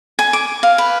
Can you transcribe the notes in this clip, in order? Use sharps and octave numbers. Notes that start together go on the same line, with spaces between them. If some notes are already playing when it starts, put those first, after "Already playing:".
G#5
D6
F5
B4